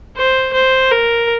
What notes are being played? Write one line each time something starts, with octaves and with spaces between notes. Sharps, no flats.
C5
C5
A#4